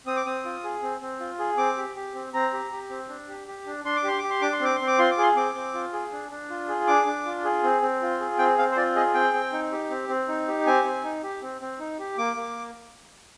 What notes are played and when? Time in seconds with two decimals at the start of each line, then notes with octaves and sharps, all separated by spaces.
0.06 C4 D#6
0.17 D6
0.26 C4 D#6
0.45 F4
0.64 G#4
0.83 C4
1.01 C4
1.20 F4
1.39 G#4
1.57 C4 D6
1.77 G4
1.96 G4
2.14 C4
2.33 C4 A#5
2.53 G4
2.71 G4
2.90 C4
3.09 D4
3.28 G4
3.48 G4
3.66 D4
3.84 D4 C6
3.96 D6
4.03 G4 C6
4.19 G4 D6
4.30 C6
4.42 D4 D6
4.53 C6
4.60 C4 D6
4.76 C4 C6
4.87 D6
4.99 F4 C6
5.11 D6
5.17 G#4 C6
5.36 C4 D6
5.55 C4
5.74 F4
5.93 G#4
6.12 D4
6.31 D4
6.50 F4
6.68 G#4
6.87 D4 D6
7.06 D4
7.26 F4
7.44 G#4
7.63 C4
7.82 C4
8.02 F4
8.20 G#4
8.38 C4 G5
8.58 C4 F5
8.71 C5
8.76 F4 D5
8.95 G#4 D#5
9.14 C4 G5
9.34 C4
9.52 D#4
9.71 G4
9.90 C4
10.09 C4
10.28 D#4
10.48 G4
10.66 C4 G#5
10.85 C4
11.04 D#4
11.23 G4
11.42 C4
11.61 C4
11.79 D#4
11.99 G4
12.18 A#3 D6
12.37 A#3